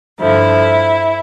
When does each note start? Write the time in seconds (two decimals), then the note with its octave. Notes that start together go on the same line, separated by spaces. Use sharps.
0.19 G2 D3 F3 E4